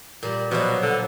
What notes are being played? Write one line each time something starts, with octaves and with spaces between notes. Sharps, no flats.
A#2 G3
B2 F3 F#3
D3